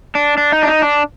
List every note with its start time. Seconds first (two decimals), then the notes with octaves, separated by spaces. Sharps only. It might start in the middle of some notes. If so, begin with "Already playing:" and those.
0.15 D4
0.37 D4
0.52 D#4
0.63 D4
0.68 D#4
0.82 D4